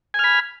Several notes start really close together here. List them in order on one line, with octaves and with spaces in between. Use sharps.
G#5 F6 B5